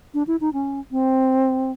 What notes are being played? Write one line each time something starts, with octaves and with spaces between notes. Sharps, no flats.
D4
E4
D#4
C#4
C4